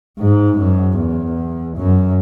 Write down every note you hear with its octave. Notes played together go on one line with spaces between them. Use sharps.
G#2
F#2
E2
F#2